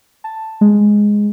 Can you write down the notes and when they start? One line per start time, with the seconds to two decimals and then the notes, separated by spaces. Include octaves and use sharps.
0.24 A5
0.61 G#3